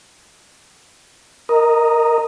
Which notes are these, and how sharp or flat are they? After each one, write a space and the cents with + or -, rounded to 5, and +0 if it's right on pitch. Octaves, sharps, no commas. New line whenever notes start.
A#4 +0 D#5 +0